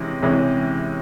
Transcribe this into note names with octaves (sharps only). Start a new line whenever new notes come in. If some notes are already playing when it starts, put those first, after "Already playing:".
Already playing: C3 E3 G#3 C#4
C3 E3 G#3 C#4